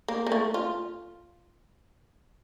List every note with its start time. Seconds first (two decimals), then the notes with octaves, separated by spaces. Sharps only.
0.08 A#3
0.26 A#3
0.32 A3
0.54 F4